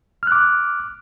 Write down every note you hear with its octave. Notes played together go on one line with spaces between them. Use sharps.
D6 F6 F#6